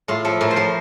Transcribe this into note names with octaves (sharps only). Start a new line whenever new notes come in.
A2 F4
F3 A4
A2 A#4
C5
F3 A#4